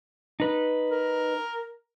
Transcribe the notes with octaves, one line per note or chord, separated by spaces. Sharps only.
D#4 B4
A#4